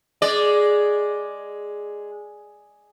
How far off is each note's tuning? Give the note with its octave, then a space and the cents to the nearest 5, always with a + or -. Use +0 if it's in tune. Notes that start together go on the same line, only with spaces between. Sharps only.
G#3 +0 D5 +0